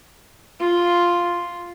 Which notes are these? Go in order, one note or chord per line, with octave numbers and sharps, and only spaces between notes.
F4